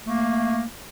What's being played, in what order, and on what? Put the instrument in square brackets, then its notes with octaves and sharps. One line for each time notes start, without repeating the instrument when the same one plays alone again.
[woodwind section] A3 A#3